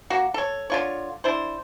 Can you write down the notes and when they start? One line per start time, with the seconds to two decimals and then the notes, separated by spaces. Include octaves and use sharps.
0.10 A#3 F#4
0.34 A4 C#5
0.70 D3 F4 C#5
1.24 D4 E4 C5